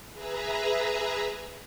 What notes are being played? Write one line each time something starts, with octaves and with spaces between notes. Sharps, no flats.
G#4 B4 E5 A#5